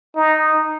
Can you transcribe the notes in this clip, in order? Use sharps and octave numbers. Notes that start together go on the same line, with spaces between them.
D#4